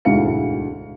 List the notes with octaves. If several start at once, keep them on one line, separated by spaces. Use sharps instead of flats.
E1 D2 G#2 E4 F5 C#7